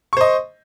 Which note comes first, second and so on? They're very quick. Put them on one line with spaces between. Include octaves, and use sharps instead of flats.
C#6 C5 D#5